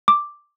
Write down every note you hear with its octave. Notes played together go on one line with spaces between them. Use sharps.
D6